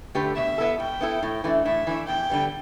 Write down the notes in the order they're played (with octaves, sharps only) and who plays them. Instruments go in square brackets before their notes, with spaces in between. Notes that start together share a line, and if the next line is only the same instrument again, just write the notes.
[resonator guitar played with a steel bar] D3 A3 G4 B4
[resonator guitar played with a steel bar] B2 [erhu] E5
[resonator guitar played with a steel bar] B3 E4 A4
[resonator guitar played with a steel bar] B2 [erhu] G5
[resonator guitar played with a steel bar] B3 E4 A4
A2
E3 A3 D4
[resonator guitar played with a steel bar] A2 [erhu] E5
[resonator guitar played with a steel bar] E3 A3 D4
[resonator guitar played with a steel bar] E2 [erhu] G5
[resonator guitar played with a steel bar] D3 G3 B3